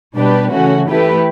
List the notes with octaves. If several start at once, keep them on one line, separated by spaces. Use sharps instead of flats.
B2 G3 D4 G4 B4
C#3 E3 A3 C#4 F#4
E3 A3 E4 G4 B4